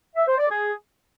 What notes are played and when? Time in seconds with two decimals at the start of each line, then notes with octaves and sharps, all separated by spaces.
0.15 E5
0.27 C5
0.38 D5
0.50 G#4